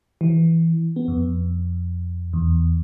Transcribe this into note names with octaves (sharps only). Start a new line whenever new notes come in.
E3
B3
F2
E2